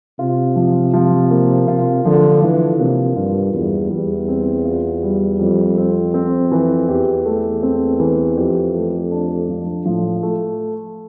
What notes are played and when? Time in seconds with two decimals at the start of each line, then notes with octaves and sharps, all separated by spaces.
0.19 C3 F4
0.56 F3
0.93 F3
1.30 A#3
1.68 C3 F4
2.05 D3 F3
2.42 E3 F3
2.79 C3 A#3
3.16 G2 F4
3.54 E2 G3
3.91 E2 G3
4.28 C4
4.65 F4
5.03 G3
5.39 F2 G3
5.77 C4
6.14 C4
6.52 E3
6.88 E2 G4
7.25 A3
7.63 C4
8.00 E3
8.37 F2 G4
8.75 A3
9.11 D4
9.49 F3
9.86 A2 F3
10.23 A3